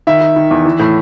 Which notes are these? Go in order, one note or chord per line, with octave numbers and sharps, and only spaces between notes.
D#3 E5
D#3
D#3
E2
E3
A2